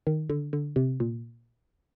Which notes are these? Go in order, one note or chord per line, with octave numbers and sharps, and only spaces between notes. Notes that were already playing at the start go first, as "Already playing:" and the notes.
D#3
D3
D3
C3
A#2